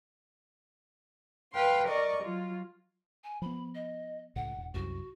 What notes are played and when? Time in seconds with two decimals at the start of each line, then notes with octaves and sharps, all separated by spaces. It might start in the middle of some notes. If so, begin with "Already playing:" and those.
1.54 B4 F5 G5 C6
1.87 A#4 D5 D#5 C#6
2.22 F#3 F4
3.23 G#5
3.42 F3 B3 B5
3.74 D#5
4.36 C#2 A2 F#5
4.57 E1
4.74 C2 F#2 F#4